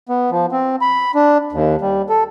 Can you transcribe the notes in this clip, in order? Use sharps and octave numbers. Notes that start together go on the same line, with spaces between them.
B3
F3
C4
B5
D4
D#2
G3
A4